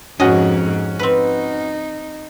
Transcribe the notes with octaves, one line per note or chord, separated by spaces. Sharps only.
F2 G#2 C#4 F#4 D#5
C4 D#4 B4